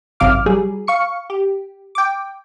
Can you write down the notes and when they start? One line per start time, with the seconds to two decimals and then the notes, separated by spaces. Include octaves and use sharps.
0.20 G#1 F#2 C3 F5 D6 F6
0.46 F#3 G3 G#4
0.88 F5 C#6 C#7
1.30 G4
1.95 G5 D6